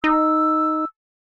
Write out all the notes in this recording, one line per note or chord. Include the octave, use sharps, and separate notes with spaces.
D#4 E6